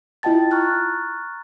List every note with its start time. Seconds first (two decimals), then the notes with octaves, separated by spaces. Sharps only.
0.23 E4 F4 D#5 G5 A5 A6
0.51 A#5 C#6 F6 F#6 A6